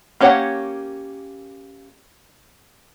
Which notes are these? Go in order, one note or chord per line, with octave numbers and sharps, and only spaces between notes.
A#3 C#4 G4 C#5 F#5